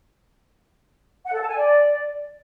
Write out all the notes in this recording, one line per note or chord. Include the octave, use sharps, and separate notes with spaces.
F#5
A4
A5
G#5
D5